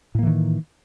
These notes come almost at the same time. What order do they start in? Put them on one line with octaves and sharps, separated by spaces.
A2 A#3 E3 D#3